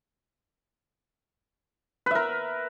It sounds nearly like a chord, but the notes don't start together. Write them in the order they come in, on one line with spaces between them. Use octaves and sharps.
B4 E5 A#4